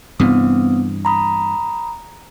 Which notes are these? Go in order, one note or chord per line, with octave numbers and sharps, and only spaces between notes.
G2 C3 E3 B3 C4 D#6
A#5 B5 D#6